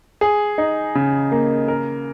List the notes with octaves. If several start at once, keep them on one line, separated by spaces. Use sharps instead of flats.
G#4
D#4
C#3
A#3
A#4